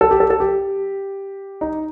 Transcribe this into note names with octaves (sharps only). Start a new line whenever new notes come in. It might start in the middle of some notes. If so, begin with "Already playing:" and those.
A4
G4
A4
A4
G4
D#4